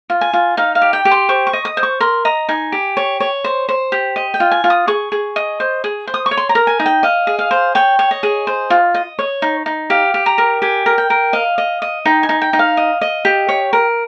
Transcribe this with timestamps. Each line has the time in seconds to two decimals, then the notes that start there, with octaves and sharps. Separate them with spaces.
0.10 F4
0.21 G#5
0.33 F4
0.57 D#4 F5
0.75 F5
0.82 G4
0.93 G5
1.05 G4
1.11 C6
1.29 C5 C#6
1.47 C#6
1.53 D#5
1.65 D#6
1.77 C5
1.83 C#6
2.00 A#4 C6
2.25 D#5 A#5
2.49 D#4 G#5
2.72 G4
2.97 C#5
3.20 C#5
3.44 C5
3.69 C5
3.92 G4
4.16 D#5
4.34 G5
4.40 F4
4.51 G#5
4.64 F4
4.70 D#6
4.87 G#4 C#6
5.12 G#4
5.36 D#5
5.60 C5
5.84 G#4
6.07 C5
6.14 D#6
6.26 C#6
6.31 C#5
6.37 C6
6.49 A#5
6.55 A#4
6.67 G#5
6.80 D#4
6.86 G5
7.03 D#5 F5
7.27 G#4
7.39 F5
7.51 C5
7.75 C#5 G5
7.99 C#5
8.11 D#5
8.23 G#4
8.47 C5
8.70 F4
8.94 D#5
9.19 C#5
9.42 D#4
9.66 D#4
9.90 G4 F5
10.14 G4
10.26 A#5
10.38 A#4
10.62 G4 G#5
10.86 A#4
10.98 G5
11.10 A#4
11.33 D#5 F5
11.58 D#5
11.82 D#5
12.05 D#4 G5
12.23 G#5
12.29 D#4
12.42 G5
12.53 D#4
12.59 F5
12.77 D#5
13.01 D#5
13.25 G4
13.49 C#5
13.73 A#4